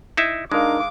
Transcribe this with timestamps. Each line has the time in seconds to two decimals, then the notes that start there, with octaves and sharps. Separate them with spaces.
0.17 D#4 E4 E5
0.52 G#3 D4 D#4 A#4 F5 D6